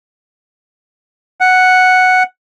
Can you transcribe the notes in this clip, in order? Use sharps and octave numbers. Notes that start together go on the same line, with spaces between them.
F#5